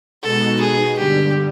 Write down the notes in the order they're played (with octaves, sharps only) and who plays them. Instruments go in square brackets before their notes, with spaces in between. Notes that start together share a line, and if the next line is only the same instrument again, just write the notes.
[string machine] B2 G#3 B3 D#4 F#4 [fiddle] A4
[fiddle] G#4
[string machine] G2 D3 G3 [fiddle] G4